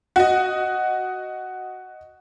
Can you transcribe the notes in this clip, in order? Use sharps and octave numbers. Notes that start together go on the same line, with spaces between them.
F#4 D#5